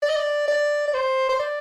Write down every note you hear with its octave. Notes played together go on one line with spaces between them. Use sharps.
D5
D#5
D5
D5
D5
C5
C5
D5